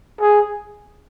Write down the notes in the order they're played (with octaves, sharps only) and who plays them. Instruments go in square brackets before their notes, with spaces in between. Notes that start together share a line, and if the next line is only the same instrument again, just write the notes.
[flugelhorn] G#4